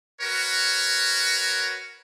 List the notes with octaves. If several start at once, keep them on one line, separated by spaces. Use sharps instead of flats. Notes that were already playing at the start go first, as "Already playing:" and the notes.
F#4 A#4 B4 C#5